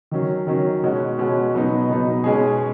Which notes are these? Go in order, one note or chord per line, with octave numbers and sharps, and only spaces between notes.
D#3 F#3 C#4
D#3 F#3 C#4
B2 G#3 C#4 F#4
B2 G#3 C#4 F#4
B2 F#3 B3 D#4
B2 F#3 B3 D#4
B2 G#3 C#4 G#4